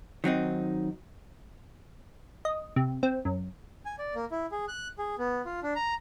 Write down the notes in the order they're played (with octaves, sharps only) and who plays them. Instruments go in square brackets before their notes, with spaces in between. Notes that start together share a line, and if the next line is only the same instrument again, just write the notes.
[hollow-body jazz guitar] D#3 F#3 C4 D#4
[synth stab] D#5
C3
C4
F#2
[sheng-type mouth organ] G#5
D5
A#3
E4
G#4
F#6
G#4
B3
F4
D4
A#5